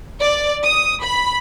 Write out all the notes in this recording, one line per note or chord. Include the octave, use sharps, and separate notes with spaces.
D5
D#6
B5